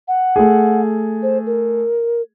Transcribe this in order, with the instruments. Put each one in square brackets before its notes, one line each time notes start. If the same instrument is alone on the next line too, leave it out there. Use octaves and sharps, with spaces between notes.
[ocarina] F#5
[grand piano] A3 G#4
[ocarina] C5
A#4